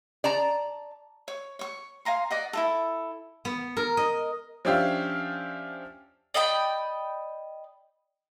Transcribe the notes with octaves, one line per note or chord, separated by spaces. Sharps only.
D5 A5 A#5
C#5
C#5 C#6
F5 G#5 A#5 C6
D5 D#5 F#5
E4 F4 A4
B3
A#4
D#5
F3 C#4 D4 G4 E5 F5
D5 D#5 G5 B5